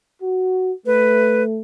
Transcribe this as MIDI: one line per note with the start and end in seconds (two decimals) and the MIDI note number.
0.22 0.72 66
0.86 1.62 57
0.86 1.43 71